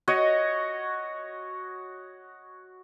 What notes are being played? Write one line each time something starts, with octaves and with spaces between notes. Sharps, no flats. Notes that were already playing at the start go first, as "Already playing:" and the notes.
F#4 C#5 D#5